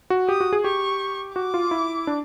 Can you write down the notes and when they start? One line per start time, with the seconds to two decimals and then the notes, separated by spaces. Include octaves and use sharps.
0.10 F#4
0.28 G4 D#6
0.40 F#4
0.53 G#4
0.64 G4 C#6
1.36 F#4 D6
1.54 F4
1.71 E4
2.07 D4